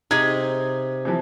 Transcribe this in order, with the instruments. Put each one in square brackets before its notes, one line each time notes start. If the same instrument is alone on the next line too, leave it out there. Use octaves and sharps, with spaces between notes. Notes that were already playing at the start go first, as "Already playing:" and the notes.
[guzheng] C3 [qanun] D#4 G#4 [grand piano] G#6
[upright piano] C3 E3 F3